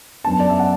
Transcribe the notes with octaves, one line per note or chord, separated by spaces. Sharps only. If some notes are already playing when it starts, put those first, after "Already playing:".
F#2 F#3 B3 D4 A5
D5
E5
F#5